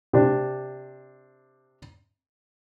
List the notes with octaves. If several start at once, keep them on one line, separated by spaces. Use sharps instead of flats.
C3 D4